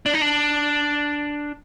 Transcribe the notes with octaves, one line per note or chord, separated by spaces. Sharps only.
D4
D#4
D4